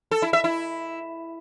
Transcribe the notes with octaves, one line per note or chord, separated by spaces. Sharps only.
A4
E4
E5
E4